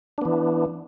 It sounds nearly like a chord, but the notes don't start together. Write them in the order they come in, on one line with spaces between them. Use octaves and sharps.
D4 B3 E3